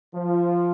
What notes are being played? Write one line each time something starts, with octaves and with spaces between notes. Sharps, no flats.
F3